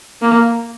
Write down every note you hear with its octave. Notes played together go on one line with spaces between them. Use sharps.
A#3